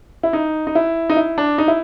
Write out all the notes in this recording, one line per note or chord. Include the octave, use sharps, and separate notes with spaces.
E4
D#4
D#4
E4
D#4
E4
D4
D#4
E4